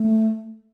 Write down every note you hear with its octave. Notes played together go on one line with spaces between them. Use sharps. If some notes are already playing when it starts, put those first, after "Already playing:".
Already playing: A3